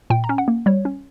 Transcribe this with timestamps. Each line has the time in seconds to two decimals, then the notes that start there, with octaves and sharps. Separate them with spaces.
0.10 A#2 G5
0.24 A#5
0.29 C#4
0.38 F#5
0.48 A#3
0.66 G3 C#5
0.85 C#4